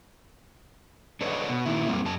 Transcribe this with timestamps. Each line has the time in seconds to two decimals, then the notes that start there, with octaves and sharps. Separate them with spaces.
1.21 D4 A4 B4 C#5 D#5
1.49 B2
1.65 A#2 D#3 E4
1.88 F#2 C3 G3 A#3 C4
2.05 F#2 A5